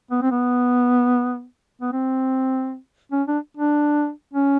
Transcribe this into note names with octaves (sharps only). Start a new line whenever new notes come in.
B3
C4
B3
B3
C4
C#4
D4
D4
C#4